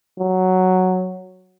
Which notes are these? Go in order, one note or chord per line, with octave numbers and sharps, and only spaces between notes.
F#3